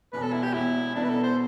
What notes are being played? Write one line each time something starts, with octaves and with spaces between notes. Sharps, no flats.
E1 E2 B2 B4
A4
E4
G4
E1 E2 B2 E4
E2 B2 B3 D4 E4
B4
A4
C5